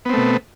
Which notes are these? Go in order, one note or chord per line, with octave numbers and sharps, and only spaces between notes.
B2 A3 B3 C4